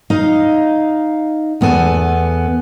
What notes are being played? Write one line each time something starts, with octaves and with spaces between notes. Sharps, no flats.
D#4 D#5 F5
E2 B3 A4 G#5